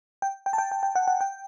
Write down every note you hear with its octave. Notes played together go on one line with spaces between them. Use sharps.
G5
G5
A5
G5
G5
G5
F#5
F#5
G5